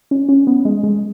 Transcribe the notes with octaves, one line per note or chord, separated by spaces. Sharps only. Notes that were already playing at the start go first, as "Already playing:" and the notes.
C#4
C#4
B3
G#3
G#3